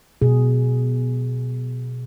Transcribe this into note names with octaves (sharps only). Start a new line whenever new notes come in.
B2 G#4